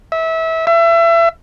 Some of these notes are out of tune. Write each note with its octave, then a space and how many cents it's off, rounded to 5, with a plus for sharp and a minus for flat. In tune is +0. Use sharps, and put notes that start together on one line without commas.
E5 -25
E5 +30